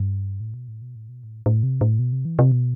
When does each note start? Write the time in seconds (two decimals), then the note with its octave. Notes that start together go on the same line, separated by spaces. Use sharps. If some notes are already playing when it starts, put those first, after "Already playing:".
Already playing: G2
0.40 A2
0.54 B2
0.68 A2
0.82 B2
0.96 A2
1.09 B2
1.23 A2
1.46 A2
1.63 C3
1.81 A2
1.99 B2
2.12 C3
2.25 E3
2.39 C3
2.52 B2